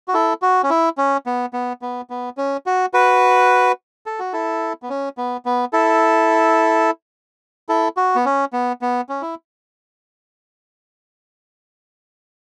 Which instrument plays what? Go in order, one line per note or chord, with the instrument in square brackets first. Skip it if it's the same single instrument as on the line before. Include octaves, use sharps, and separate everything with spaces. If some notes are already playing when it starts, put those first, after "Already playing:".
[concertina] F#4
E4 A4
F#4
C#4
E4
C#4
B3
B3
B3
B3
C#4
F#4
F#4 B4
A4
F#4
E4 A4
B3
C#4
B3
B3
E4 A4
E4 A4
F#4
B3
C#4
B3
B3
C#4
E4